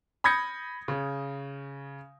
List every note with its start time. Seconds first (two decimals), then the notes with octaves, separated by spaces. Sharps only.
0.24 B5 D#6 G6 G#6 A#6 C#7
0.88 C#3